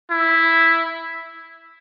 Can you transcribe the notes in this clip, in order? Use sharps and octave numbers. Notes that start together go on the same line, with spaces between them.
E4